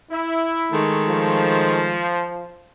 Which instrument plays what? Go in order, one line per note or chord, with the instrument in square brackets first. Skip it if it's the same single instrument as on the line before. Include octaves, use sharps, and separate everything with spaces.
[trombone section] E4
[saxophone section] D#3 G#3 A3
[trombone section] F3